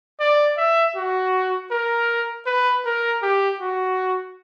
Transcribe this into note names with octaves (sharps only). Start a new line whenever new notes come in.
D5
E5
F#4
A#4
B4
A#4
G4
F#4